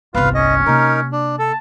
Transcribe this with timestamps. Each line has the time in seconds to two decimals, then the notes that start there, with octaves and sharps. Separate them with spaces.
0.15 G1 C2 F4 B4 F5
0.35 C#4 D#5
0.66 C3 A#3 D#4 A#4
1.12 D4
1.39 A4 A5